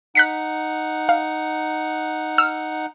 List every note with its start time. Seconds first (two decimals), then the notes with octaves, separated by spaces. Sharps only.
0.15 D#4 F#5 F#6 B6 C#7
1.09 F5
2.38 E6 F6